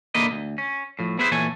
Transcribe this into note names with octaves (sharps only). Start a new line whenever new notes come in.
E2 A#2 D3 A#3 E4 D#5
D2
C#4
A2 F3
B3 E4 G#4 B4 C5
A#2 E3 A4 C#5 G#5